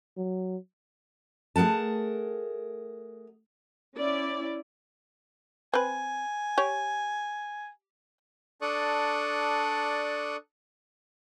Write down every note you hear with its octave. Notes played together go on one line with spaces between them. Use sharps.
F#3
A3 G#4 A#4 F#5 A5
C#4 E4 D5
C4 B4 G#5
G4 C#5
D4 A4 D5 C#6 D#6 F#6